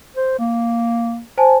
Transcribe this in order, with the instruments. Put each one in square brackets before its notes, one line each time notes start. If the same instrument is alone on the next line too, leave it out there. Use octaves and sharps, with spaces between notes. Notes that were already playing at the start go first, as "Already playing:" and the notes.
[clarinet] C5
A#3
[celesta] C5 G#5 A5